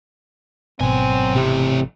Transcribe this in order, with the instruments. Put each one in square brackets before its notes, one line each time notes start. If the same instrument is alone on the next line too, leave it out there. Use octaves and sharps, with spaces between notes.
[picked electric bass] G#1 B2 [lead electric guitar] F#2 G#5 [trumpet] C4
[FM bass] C3 [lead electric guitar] E3 A3